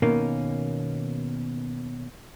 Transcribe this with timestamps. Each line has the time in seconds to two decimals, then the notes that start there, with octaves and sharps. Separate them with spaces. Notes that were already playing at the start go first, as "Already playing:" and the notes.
0.02 B2 D#3 A#3 C#4